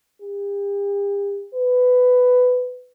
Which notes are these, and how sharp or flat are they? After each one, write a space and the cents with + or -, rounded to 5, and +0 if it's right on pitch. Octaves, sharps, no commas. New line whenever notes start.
G4 +40
B4 +15